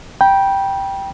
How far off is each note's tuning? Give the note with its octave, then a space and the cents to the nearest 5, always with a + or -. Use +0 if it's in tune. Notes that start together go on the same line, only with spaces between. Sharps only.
G5 +0 B5 -35